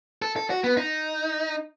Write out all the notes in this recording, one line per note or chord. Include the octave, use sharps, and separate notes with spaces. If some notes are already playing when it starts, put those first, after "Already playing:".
A4
A4
F#4
B3
D#4